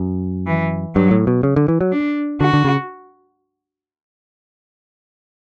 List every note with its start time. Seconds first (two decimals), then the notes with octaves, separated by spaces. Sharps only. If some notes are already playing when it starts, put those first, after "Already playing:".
Already playing: F#2
0.47 E3
0.95 G2 F#3
1.11 A2
1.27 B2
1.43 C#3
1.56 D3
1.68 E3
1.81 F#3
1.92 D4
2.41 D3 F#4
2.53 D3
2.65 C#3